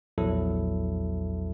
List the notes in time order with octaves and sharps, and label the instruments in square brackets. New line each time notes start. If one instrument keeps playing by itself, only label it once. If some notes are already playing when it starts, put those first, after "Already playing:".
[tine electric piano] A#1 E2 F#3 E4 A4